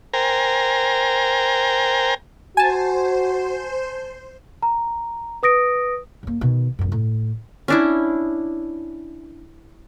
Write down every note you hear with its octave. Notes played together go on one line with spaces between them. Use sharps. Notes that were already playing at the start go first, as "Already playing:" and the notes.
A#4 C5 G5 G#5 A#5
F#4 C5 G#5 A5
A#5
B4 D#6 A#6 D7
F#2 A#3
B2 D#3
A1 F#2
A2
C#4 D4 E4